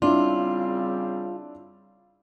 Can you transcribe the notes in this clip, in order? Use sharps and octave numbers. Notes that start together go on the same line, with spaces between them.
C#3 G3 C4 D4 E4 F4